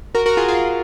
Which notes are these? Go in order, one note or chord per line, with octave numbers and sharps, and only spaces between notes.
F#4 A#4
F#4 A#4
F4 G#4
F4 G#4